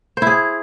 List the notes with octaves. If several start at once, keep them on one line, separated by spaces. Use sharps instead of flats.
E4 G#4 C5